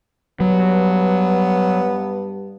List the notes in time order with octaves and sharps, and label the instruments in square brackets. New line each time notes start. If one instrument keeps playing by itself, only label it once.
[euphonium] G2 [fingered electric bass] F#3 [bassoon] B3